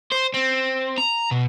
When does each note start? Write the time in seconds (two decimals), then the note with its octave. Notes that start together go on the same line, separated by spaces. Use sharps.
0.12 C5
0.34 C4
0.98 A#5
1.31 B2